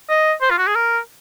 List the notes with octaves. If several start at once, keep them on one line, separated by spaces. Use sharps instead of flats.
D#5
C5
F4
F#4
G#4
A#4